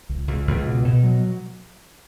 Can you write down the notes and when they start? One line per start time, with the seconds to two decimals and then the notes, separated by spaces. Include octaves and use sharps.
0.09 C#2
0.28 C#2
0.47 C#2
0.66 B2
0.85 B2
1.04 F#3